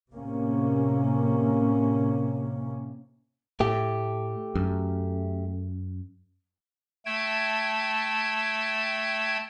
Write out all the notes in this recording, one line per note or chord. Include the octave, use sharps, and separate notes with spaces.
A2 C3 A#3 C#4
A2 A3 G4
F#2
A3 G5 A5 G#6